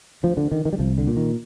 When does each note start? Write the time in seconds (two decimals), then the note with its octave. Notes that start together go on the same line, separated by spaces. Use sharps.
0.23 D2 F3
0.37 D3
0.52 D3 D#3
0.65 D#3
0.73 G3
0.78 C2 F3
0.98 D3
1.07 A#2
1.17 D#3